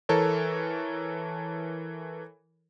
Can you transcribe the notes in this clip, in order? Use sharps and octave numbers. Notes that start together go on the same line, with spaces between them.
E3 A4 A#4 C#5